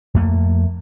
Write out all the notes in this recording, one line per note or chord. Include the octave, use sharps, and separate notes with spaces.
F2 A3 A#3